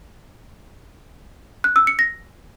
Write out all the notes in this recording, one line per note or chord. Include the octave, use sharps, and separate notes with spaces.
F#6
E6
C#7
A#6